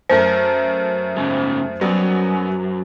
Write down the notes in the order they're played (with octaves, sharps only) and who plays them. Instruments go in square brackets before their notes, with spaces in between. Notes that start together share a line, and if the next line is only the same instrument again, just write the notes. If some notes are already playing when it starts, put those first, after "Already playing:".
[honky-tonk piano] F#2 A3 A#4 [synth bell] C5
[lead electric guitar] G#2 C#3
[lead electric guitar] F#2 [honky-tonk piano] F#3 G3 B3